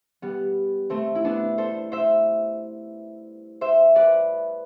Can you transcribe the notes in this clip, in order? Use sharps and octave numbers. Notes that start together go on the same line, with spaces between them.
G3 B3
A3 C4
E4
B3 D4
A4 C5
C5 E5
C5 E5
B4 D5